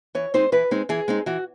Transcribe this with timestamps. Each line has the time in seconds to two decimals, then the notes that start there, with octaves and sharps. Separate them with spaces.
0.15 E3 C#5
0.34 G#3 C4 D#4 C5
0.52 E3 B4
0.71 G#3 C4 D#4
0.89 E3 G#4
1.08 G#3 C4 D#4
1.26 E3 F#4